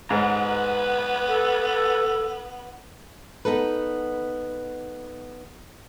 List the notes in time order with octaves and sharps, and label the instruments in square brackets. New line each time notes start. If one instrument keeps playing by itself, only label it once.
[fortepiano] G#2 [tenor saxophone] B3 [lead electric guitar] B4 A#5
[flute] A4
[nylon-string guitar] B3 D#4 A4 B4